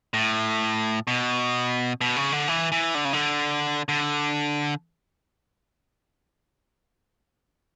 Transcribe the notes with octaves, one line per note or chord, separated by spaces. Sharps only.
A2
B2
B2
C#3
D3
E3
E3
D3
C#3
D3
D3